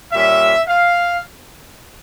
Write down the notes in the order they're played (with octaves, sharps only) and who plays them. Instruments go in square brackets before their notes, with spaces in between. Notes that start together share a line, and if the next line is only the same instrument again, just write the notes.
[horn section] A#2 G3 C#4 E5
F5